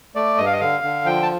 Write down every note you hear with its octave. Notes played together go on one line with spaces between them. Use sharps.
A3 D5
G2 D#5
F5
D#5
D3 F5
D3
F3 G5
A5